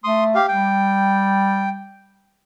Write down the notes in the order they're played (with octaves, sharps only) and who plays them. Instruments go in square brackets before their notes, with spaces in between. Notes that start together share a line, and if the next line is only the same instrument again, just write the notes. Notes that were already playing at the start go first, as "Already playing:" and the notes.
[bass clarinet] A3 [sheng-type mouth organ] C6 D#6
[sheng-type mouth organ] G4 F5
[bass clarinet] G3 [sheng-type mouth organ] G5